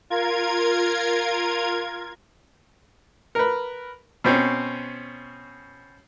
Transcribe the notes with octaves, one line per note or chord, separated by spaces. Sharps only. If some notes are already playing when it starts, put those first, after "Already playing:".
F4 A#4 G#6
A#4 B4
B2 C4 C#4